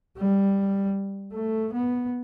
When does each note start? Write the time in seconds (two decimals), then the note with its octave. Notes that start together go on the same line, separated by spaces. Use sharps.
0.17 G3
1.33 A3
1.73 B3